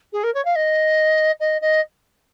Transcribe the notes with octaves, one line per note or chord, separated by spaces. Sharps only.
G#4
A#4
C#5
F5
D#5
D#5
D#5